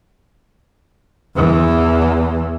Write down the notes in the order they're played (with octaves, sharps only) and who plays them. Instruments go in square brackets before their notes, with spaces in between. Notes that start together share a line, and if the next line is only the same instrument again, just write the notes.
[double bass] E2 E3